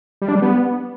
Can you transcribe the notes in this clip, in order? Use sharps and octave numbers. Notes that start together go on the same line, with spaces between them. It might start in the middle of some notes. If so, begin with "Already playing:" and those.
G3
D4
G3
B3